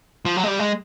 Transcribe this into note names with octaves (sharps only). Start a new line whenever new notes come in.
F3
F#3
G#3
G3
G#3